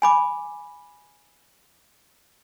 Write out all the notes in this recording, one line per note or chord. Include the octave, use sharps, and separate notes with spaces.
G#5 B5 D6